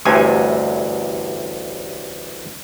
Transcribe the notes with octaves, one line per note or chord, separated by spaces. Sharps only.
A1 D2 G2 C3 G#5